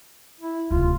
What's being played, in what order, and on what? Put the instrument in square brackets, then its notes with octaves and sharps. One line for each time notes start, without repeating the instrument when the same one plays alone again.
[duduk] E4
[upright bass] D1 C3 [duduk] F4